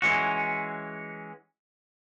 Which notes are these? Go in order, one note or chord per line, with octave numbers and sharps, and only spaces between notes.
E3 G#3 C#4 F#4